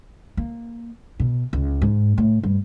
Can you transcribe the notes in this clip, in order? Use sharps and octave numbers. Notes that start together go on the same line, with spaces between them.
A#3
B2
C#2
G#2
A2
G2